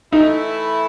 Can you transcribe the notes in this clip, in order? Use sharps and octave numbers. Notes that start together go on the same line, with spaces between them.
E3 A3 D#4 E4